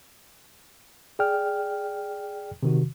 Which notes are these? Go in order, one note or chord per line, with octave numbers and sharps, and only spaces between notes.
G#4 D5 G5 F6
C3 D#3 F#4